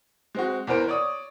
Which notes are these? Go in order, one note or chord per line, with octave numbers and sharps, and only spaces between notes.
G#3 C4 F#4
E2 B3 A#4 C5 D7
C#5 D5 C#6 D#6